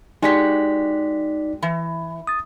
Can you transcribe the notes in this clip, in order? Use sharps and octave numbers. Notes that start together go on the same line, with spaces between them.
G#3 D#4 F#4 G4 D5 B6
E3
D#6 A6